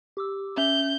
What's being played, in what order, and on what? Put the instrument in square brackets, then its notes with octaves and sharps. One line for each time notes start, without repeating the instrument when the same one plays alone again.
[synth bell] G4 D6 E6
[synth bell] C#4 E5 F7 [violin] G6